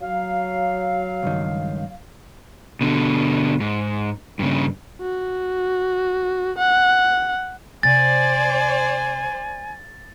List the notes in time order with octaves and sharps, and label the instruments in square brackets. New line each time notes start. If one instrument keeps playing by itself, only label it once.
[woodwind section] F#3 F5
[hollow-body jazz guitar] C#2 G2 D#3
[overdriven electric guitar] B2 D3
G#2
G2 C#3
[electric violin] F#4
F#5
[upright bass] C3 E3 [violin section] C5 D5 [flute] G#5 [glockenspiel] A6